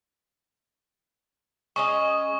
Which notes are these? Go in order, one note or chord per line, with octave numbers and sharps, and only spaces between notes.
G#3 C#4 D#5 C#6